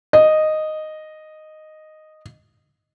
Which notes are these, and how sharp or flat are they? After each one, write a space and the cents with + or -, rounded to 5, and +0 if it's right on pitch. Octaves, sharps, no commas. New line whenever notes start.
D#5 -5